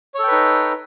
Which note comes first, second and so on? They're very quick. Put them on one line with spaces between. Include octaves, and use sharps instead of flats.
C#5 A4 G5 B4 D#4